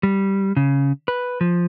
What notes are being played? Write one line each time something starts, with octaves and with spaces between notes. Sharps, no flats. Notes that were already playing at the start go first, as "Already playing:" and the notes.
G3
C#3
B4
F3